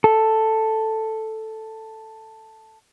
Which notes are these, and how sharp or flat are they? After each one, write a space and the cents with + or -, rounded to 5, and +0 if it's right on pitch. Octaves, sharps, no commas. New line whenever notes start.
A4 +5